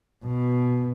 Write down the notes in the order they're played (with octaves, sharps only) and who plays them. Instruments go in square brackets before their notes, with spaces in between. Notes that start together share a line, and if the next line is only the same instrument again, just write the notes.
[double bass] B2